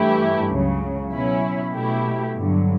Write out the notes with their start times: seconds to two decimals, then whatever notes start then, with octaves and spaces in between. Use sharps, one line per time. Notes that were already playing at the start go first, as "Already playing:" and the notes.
Already playing: G2 E3 A3 E4 G4
0.51 C#2 C#3 F#3
1.13 B2 F#3 C#4 E4
1.75 B2 A3 E4 G4
2.37 G2 D3 F#3